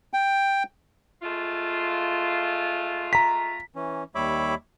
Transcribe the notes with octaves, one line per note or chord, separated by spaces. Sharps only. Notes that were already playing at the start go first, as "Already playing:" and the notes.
G5
G#3 A3 F4
A#5 B6
E3 C#4
D#2 G3 C#5 E5 B5 D6